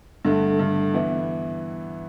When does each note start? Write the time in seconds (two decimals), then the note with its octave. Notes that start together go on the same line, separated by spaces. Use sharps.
0.25 G2 D3 A3
0.59 G2 D3 A3
0.94 E3 B3 E4